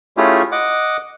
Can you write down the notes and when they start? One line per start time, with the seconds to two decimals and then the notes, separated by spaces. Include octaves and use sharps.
0.17 A3 C#4 E4 F4 G4 G#4
0.52 D#5 F#5 D6